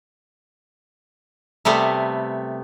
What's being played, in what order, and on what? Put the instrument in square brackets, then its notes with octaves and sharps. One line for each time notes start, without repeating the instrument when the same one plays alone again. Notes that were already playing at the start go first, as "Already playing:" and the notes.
[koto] C3 G3 A3 B3